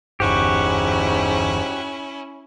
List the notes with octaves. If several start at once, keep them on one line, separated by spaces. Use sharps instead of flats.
G1 E2 G#2 C#4 E4 F#4 G4